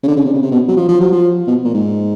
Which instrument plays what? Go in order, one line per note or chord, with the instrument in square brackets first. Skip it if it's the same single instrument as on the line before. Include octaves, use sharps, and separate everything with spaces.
[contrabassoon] C#3
D3
C#3
C3
C#3
C3
B2
F#3
F3
F3
F#3
F3
B2
A#2
G#2